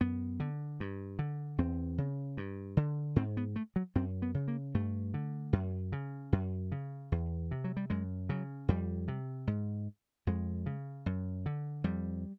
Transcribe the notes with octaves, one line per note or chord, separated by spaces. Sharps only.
F#2 B3
D3
G2
D3
E2 C4
C#3
G2
D3
G#2 C4
B3
A3
F#3
F#2 C4
B3
C#3
A#3
G2 A3
D3
F#2
C#3
F#2
C#3
E2
C3
F#3
G3
F#2 G#3
C#3 F#3
F2 G3
C3
G#2
F2 G#3
C#3
F#2
D3
F2 G3